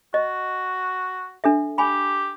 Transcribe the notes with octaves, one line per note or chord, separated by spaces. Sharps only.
F#4 D#5
D4 A4 E5
G4 G#5 B5